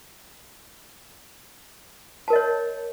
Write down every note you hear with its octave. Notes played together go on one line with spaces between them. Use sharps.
A#4 C#5 D#5 A5